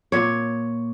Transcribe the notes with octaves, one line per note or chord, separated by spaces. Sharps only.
A#2 C#5